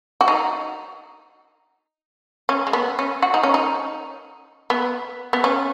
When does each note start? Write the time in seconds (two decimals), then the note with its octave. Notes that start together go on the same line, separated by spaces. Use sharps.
0.21 F#4
0.28 D#4
2.49 C#4
2.67 G#3
2.73 B3
2.99 C#4
3.22 F#4
3.34 D#4
3.43 C#4
3.54 D#4
4.70 B3
5.33 B3
5.44 C#4